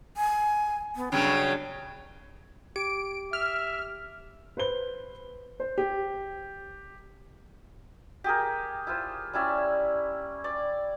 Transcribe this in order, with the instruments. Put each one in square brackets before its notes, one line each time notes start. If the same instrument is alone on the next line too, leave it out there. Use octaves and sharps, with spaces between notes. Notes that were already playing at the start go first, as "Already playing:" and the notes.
[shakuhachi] G#5
B3
[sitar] G2 C#3 F#3 [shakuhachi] G5
[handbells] G4 [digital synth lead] D7
[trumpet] E5 [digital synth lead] F6
[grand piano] B4 C5 G7
[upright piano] C5
G4
[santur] G4 G#4 A#4
E4 F4 C5
G3 C#4 E4 D5
D5